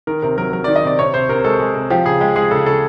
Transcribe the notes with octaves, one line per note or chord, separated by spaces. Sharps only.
D#3 A#4
C3 A#4
F#3 A#4
F#3 A#4
D#3 D5
D#5
C3 D5
C3 C#5
C3 C5
C3 A#4
G#3 A4
G#3
C3
F3 G4
C#3 G#4
G#3 G4
G#3 G#4
C#3 A4
C#3 A4